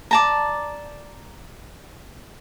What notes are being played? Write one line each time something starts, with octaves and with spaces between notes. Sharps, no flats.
D5 A5 A#5